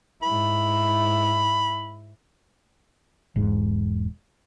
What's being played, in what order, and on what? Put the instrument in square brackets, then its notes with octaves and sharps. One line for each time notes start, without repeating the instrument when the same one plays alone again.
[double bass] G#2 E4 [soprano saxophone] B5
[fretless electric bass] E1 G#2